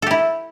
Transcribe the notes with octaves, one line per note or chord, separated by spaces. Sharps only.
E4 G4 A4